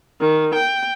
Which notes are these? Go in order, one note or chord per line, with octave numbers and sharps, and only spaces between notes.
D#3
G5